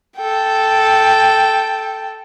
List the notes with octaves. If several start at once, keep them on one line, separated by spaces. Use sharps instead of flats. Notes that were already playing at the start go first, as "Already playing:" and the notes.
A4 G5